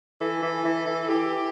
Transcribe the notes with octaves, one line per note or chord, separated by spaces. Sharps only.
E3 A4
E3
E3
E3
E3 G4